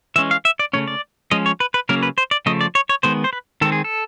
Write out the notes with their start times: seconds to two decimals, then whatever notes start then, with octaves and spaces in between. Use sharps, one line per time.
0.16 E3 G#3 C#4 E5
0.31 F5
0.45 E5
0.59 D5
0.73 C#3 F3 A3 C#4 C#5
0.88 D5
1.31 F3 G#3 C#4 D#5
1.46 C#5
1.60 B4
1.74 B4
1.89 C#3 F#3 A#3 C#4 A#4
2.03 B4
2.18 C5
2.31 D5
2.46 C#3 F3 A3 D#5
2.61 D5
2.75 C#5
2.89 C#5
3.03 D#3 G#3 B3 C5
3.24 C5
3.33 B4
3.61 D#3 G#3 C4 A4
3.72 G#4
3.84 A4